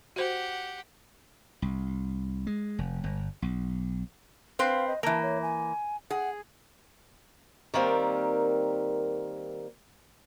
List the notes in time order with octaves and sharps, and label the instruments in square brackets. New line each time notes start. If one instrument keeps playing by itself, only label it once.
[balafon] F#4 C5 [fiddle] G4 F#5
[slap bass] C2
G#3
F1
G1
B1
[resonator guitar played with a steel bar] C4 B4 C5 [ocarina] F5
[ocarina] D#5
[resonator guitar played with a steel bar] E3 A#3 [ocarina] A5
[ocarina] C#5
G#5
[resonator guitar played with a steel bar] G#4 [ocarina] F#5
[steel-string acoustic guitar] D#3 G3 A#3 C4 A#4